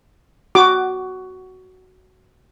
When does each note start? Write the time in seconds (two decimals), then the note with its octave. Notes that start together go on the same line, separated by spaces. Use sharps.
0.55 F#4 D6